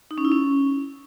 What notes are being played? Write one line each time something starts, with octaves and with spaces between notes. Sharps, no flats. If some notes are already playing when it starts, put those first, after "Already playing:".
D#4
C#4
E4
C#4